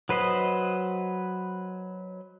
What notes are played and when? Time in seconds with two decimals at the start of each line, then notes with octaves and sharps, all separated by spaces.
0.09 F#3 B4 C5 D#5